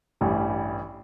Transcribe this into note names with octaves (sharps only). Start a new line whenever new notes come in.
A1 G2 E3 G3